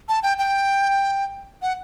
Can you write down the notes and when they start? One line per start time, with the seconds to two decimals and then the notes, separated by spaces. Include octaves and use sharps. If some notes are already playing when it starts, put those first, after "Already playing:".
0.09 A5
0.23 G5
0.39 G5
1.62 F#5